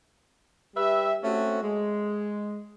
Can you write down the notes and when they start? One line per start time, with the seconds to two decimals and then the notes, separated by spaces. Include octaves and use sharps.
0.76 G3 G4 B4 E5
1.23 A3 C4 C#4 F#4
1.63 G#3